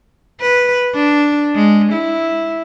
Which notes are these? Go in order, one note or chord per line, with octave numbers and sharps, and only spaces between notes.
B4
D4
G#3
E4